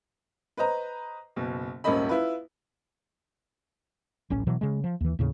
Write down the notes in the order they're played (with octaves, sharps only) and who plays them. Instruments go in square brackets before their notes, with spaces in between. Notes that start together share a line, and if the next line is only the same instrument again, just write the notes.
[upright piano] B4 C5 D#5 A#5
F#1 B2
D#1 G#1 A#3 C#4 D#5 B5
E4 F4 B4
[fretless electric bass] D1 A1 C#4
B2 E3 F#3
C#3 G#3
F3
D#2 E3
D#2 A2 C#3